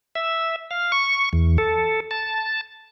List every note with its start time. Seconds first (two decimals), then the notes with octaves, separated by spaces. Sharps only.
0.15 E5
0.71 F5
0.92 C#6
1.33 E2
1.58 A4
2.11 A5